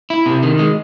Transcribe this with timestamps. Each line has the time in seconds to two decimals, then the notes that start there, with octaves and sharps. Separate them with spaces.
0.10 E4
0.26 C3
0.43 D#3
0.59 G#3